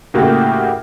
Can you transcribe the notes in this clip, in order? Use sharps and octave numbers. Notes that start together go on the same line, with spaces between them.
A2 C#3 A#3 F#4 G4